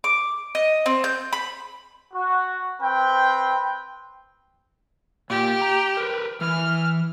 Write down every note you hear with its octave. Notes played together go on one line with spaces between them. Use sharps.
D6
D#5
C4
G6
B5
F#4
C4 B4 G5
A#2 G4
A#5
A#4 B4
E3 F6